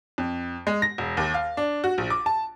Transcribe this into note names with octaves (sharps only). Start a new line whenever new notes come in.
F2
G#3
A#6
E1
D#2
F5
D4
F#4
A#1
D6
A5